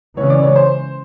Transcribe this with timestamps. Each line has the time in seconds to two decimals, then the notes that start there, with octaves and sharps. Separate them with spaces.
0.17 C#3 E3 G#3 C#4 C#5
0.30 D5
0.43 C#5
0.56 C5